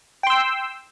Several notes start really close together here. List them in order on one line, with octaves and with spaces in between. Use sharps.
G5 C6 E6